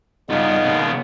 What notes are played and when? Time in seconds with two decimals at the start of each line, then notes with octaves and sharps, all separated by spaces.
0.29 G2 C#3 B3 D#4 F4
0.65 D#2 B2